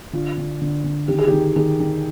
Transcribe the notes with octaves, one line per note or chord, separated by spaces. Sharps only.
D3 F4
D3
D3
D3
D#3 G4
G#4
D#3 G4
D#3 G#4
D#3